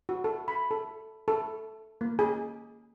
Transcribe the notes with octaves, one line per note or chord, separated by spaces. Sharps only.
F#4
A4
B5
A4
A4
A#3
G#4